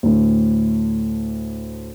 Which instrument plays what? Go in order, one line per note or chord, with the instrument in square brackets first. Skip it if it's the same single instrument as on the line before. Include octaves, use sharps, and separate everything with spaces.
[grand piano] D2 A2